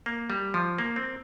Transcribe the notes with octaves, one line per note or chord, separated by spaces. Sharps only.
A#3
G3
F3
A#3
C4